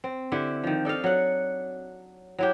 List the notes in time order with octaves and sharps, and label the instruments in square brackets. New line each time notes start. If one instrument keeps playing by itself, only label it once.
[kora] C4
D3 E4 G4 E5
D#3 F3
D4 A4 D#5 F5
F#3 F#5
F#3 E4 G4